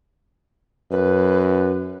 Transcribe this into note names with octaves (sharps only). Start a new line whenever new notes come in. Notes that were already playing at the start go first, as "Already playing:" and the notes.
F#2 B4